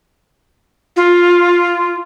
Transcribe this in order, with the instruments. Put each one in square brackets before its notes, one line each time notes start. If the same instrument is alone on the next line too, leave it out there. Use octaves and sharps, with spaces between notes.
[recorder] F4